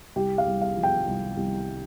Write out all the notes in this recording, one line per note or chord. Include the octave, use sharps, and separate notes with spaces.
C2 G4
F5
C2
F5
F3
G5
C2
C2